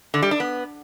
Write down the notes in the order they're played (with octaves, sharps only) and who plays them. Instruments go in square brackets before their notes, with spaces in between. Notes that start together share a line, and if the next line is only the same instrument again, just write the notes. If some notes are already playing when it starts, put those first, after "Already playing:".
[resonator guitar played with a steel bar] D3
G3
D4
B3